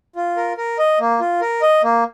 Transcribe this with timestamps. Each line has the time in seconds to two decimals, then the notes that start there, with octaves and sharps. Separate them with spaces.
0.16 F4
0.37 A#4
0.57 A#4
0.78 D#5
1.00 A#3
1.20 F4
1.41 A#4
1.62 D#5
1.83 A#3